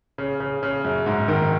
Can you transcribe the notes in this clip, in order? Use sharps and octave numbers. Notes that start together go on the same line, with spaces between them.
C#3
C#3
C#3
F#2
G#2
D#3